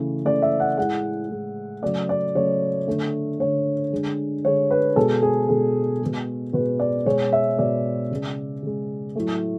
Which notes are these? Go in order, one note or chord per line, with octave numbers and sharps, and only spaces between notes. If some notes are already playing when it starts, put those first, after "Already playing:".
Already playing: C#3 E3 A3
C#3 E3 A3 D5
E5
F#5
A2 G#3 F#5
A2 G#3
C#3 F#3 A3 D5
D5
C#3 F#3 A3 C#5
D3 A3
D3 A3 C#5
D3 G#3
D3 G#3 C#5
B4
B2 G#3 A4
G#4
B2 G#3 A4
B2 G#3
B2 B4
G#3
D5
B2 G#3 C#5
E5
B2 G#3 D5
C#3 G#3
C#3 G#3
A2 F#3 A3